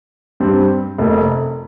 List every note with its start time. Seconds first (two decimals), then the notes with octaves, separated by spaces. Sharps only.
0.40 G2 G3 C4
0.98 F1 F2 C3 A#3